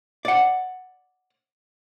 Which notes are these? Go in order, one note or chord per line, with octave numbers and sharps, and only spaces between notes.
D5 F#5